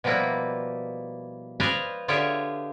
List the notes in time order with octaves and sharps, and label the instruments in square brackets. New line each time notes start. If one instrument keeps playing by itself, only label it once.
[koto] B2 F3 G3 A#3 E4 B4
B4 C5 D5 D#5 F5 G#5
D3 F4 G4 G#4 C#5 E5